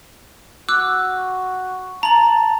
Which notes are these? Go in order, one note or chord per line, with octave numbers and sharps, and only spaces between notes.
F#4 D6 E6 F#6
A5 A#5 F#7